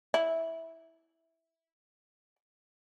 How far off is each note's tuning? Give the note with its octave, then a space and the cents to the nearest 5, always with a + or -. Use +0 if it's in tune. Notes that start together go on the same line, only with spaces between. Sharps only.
E4 -10